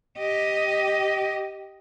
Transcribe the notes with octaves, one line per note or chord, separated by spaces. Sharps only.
G4 D#5